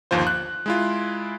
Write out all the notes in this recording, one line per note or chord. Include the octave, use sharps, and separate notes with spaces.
G1 D#2 F3 F4 C5
F#6
G#3 E4 F4